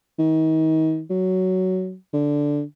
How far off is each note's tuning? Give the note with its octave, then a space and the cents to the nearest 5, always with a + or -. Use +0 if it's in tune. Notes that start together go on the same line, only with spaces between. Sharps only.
D#3 +35
F#3 +10
D3 -5